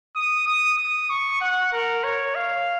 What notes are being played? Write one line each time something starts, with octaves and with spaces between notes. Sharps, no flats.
D#6
D#6
D#6
C#6
F#5
A#4
C#5
F5